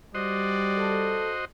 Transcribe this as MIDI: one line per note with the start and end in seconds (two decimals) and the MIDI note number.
0.15 1.26 55
0.15 1.45 66
0.15 1.45 72
0.15 1.25 74
0.15 1.45 75
0.78 1.31 69